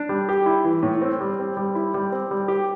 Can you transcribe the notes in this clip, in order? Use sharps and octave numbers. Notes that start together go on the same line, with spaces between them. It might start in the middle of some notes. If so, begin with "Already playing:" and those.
Already playing: D4
G3
G4
E4
E3
A2
C4
G3
C4
G3
E4
G3
C4
G3
G4